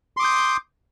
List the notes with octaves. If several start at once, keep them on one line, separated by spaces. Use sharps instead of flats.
C6 D6 D#6 G6